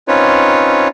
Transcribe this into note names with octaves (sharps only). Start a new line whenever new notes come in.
C4 C#4 D#4 F4 B4 C#5